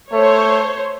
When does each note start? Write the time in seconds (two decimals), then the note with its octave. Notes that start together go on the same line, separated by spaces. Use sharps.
0.12 A3 C5 C#5